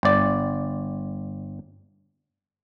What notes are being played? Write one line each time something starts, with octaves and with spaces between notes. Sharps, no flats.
G1 D5